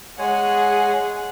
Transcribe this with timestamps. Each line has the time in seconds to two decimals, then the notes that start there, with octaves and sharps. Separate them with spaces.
0.19 G#3 G#4 C#5 F#5 G#5